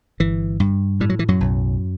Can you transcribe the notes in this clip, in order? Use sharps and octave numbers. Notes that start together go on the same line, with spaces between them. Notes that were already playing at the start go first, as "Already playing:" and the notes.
G1 E3
G2
A2 G3
F#3
E3
F#2 F#3
B1